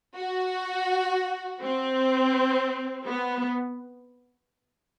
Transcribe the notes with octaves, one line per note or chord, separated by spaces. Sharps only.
F#4
C4
B3